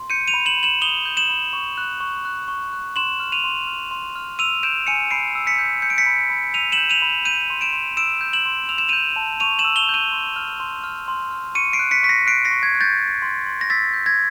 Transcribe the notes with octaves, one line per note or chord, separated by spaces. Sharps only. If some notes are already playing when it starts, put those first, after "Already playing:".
Already playing: C6
G6 C#7 D#7
D#7 F7
B5
E7 F#7
B5
E7 F#7
D#6 F7 G7
G6
E7 F#7
B5
C#6
F#6
C#6
F#6
C#6
F#6
C6 E7 F#7
F6
D#7 F7
C6
F6
C6
F6
E6 D#7 F7
G6 D7 E7
G#5 C#7 D#7
B5 C7 D7
E6
B6 C#7
G6
G6 C#7
D7
B6 C#7
B5
B5
E6 D#7 F7
E7 F#7
G6
D#7 F7
B5
G6 D#7 F7
C6
D7 E7
C6
E6 D7 E7
G6
E7 F#7
C6
E6 F7
E7
G6 D#7 F7
A5
C#6 D#7 F7
E7 F#7
E6
F7 G7
G6
D#7 F7
C6
F6
C6
F6
C6
F6
C#6 C#7 D#7
C7 D7
F#6
B6 C#7
C#6 B6
A#6 C7
F#6 C7 D7
A#6 C7
C#6
G#6
F#6
G6 A6
G6
C6
C6
A#6
E6 A6 B6
G6
G#6 A#6